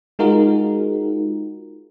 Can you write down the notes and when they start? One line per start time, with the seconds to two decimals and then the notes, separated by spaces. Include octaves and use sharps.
0.19 G#3 D#4 F4 F#4 G#4 A#4